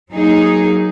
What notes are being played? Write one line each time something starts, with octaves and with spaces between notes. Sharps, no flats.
F#3 A#3 D#4 G#4